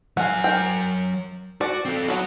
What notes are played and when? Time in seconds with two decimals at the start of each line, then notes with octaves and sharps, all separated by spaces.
0.17 F#3 F5 F#5 G#5
0.44 A#4 G5
1.61 F#4 D5
1.85 C4 A4
2.08 F#3 B3 F#4 C#5